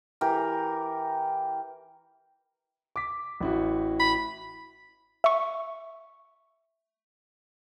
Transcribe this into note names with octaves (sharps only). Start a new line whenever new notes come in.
E3 G4 A#4
D6 B6
A1 E4 F#4
B5
E5 C#6